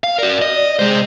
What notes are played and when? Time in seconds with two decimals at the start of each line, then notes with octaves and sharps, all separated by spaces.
0.04 F5
0.18 F#4 A#4 D5
0.42 D#5
0.55 D5
0.79 C3 G#3 C5